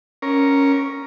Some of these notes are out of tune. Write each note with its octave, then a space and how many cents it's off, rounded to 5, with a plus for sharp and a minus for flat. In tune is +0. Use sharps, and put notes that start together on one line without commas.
C#4 +0 A#4 +5